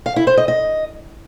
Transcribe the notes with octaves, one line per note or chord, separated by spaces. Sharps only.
F5
E4
C5
D#5
D#5